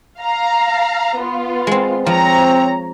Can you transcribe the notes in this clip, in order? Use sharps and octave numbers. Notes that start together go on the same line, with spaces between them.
F5 A#5
B3 F4
G#3 C4
F3 C4 C#5 A#5